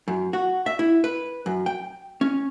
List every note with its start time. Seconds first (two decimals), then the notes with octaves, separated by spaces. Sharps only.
0.08 F#2
0.33 F#4
0.66 E5
0.79 E4
1.04 B4
1.46 F#2
1.66 G5
2.21 C#4